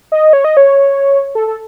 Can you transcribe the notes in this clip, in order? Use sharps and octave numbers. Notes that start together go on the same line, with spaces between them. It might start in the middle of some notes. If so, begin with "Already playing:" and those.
D#5
C#5
D#5
C#5
A4
A4